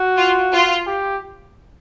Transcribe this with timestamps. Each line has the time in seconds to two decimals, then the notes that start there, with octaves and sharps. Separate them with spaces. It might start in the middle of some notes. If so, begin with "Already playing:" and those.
Already playing: F#4
0.17 F4
0.52 F4
0.87 G4